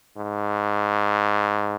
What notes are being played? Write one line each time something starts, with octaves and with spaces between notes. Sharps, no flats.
G#2